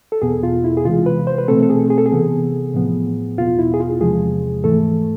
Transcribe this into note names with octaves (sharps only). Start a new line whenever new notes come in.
A4
E2 B2 B3 G#4
F4
E4
G#4
C3 E3 G#3 F4
B4
C5
B4
B2 A3 C4 A4
A4
G#4
G#4
A4
G#4
C3 E3 B3
A2 F3 B3
E2 B2 B3 F4
E4
G#4
F4
E2 C3 F3 G#3 G#4
G#2 E3 A3 A4